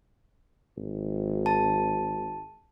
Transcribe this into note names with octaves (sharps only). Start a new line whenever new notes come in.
G#1
A5